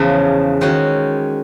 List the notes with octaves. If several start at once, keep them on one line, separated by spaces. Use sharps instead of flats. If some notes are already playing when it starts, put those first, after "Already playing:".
Already playing: E2 C#3 F3
D#3 G#3 C#4 F#4